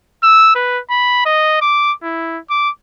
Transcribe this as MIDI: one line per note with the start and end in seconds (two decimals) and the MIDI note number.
0.24 0.55 88
0.55 0.80 71
0.90 1.21 83
1.26 1.58 75
1.62 1.93 86
2.03 2.39 64
2.50 2.70 86